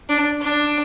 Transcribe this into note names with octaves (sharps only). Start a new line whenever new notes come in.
D4
D4